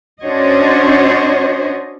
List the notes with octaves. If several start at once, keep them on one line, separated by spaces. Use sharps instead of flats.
C#4 D4 F#4 C5 C#5 D#5